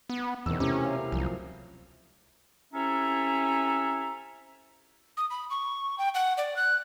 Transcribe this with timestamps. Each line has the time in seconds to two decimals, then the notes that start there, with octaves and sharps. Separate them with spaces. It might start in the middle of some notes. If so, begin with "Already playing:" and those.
0.10 B3
0.46 E2 B2 D#3 E3 C4 E6
0.60 C3 A3 C#4 E4 A#4
0.85 F5
1.12 C2 F3 F#3
2.73 C3 C#4 E4 A4 E5 A#5
5.17 D#6
5.30 B5
5.50 C#6
5.98 G5
6.15 F#5
6.37 D5
6.56 F#6